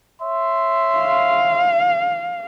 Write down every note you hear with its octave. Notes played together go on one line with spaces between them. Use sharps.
C#5 E5 C6
F5